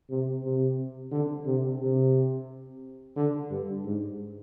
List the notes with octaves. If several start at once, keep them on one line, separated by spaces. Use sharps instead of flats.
C3
C3
D3
C3
C3
D3
G2
G#2